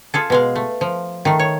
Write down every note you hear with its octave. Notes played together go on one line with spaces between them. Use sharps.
F4 G#4 A4
B2 G#3 F5
A3
F3
D#3 A3
C#5